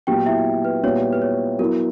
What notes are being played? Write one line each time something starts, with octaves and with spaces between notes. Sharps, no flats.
A#2 F#3 B3 G4 G5
E4 E5
B4
A#2 G3 B3 F#4 C#5
B4
C#5
F#3 B3 E4 A#4